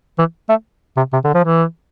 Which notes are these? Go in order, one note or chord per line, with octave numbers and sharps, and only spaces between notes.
E3
A3
C3
C3
D3
F3
E3